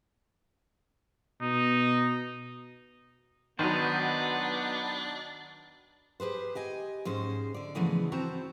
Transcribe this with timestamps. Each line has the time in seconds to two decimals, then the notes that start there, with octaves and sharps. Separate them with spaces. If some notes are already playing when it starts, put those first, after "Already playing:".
1.42 B2 D#4
3.59 D#3 F#3 B3 D4 D#4 B4 C5
6.20 G4 G#4 B4 C5
6.55 G4 D#5 G#5
7.05 G#2 G#3 C#4 C5
7.54 D3 D5
7.75 C#3 E3 F3 G#3 A3 B3
8.12 C4 E4 F#4 C5 A5 A#5